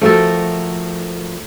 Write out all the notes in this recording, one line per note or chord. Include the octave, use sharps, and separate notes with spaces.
F3 A3 F#4 A4 A#4